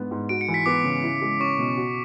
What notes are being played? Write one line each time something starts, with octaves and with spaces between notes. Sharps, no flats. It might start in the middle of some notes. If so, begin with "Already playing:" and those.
Already playing: G#2 G#3 B3 D4
G#2
F#4 D7
C#7
E3
B6
B3 D6
C#3
E4
G#3
C#4 C#6
B2
F#4